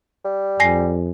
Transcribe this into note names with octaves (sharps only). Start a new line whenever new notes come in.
G3
F2 G#5 A#6 C7